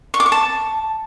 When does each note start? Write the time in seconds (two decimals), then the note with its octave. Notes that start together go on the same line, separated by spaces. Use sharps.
0.14 C#6
0.20 D6
0.26 C#6
0.32 A5